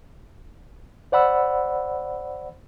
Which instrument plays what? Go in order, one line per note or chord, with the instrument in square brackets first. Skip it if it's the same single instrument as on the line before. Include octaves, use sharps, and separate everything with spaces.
[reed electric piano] C5 D5 F#5 B5 E6